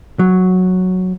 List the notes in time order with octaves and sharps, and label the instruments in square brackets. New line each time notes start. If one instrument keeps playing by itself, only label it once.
[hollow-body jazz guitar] F#3